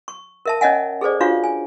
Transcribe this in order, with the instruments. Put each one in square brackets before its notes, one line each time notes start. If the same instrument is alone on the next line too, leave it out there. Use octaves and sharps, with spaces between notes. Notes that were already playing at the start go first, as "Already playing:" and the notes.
[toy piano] C#6
A#4 E5 A5
C#4 C#5 D#5 E5 F#5 G#5
G#4 A4 C5 D5
D4 F4 F#4 C#5 F5 C#6
G#5